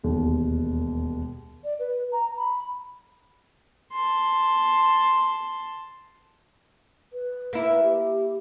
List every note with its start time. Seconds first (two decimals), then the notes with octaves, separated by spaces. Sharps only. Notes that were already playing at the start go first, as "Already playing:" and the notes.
0.04 E1 D#2
1.64 D5
1.79 B4
2.12 A#5
2.37 B5
3.92 A5 C6
7.13 B4
7.53 A#3 E4
7.83 G4